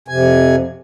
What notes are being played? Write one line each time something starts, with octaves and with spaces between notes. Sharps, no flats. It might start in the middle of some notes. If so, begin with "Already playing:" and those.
F2 C3 G#5